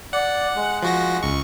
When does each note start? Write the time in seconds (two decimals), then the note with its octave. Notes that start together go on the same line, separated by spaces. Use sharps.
0.13 D5 F#5
0.56 G#3
0.83 F3 F#4 A#6
1.23 C#2 C#6